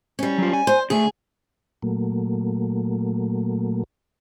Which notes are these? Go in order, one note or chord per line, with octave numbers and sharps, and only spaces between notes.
G3 C#4
F#3 F4
G#5
C5
D3 A3 G#4
A#2 F#3 A3 A#3